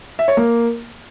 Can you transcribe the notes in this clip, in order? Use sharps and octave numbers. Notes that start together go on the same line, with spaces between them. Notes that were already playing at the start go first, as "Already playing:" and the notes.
E5
C#5
A#3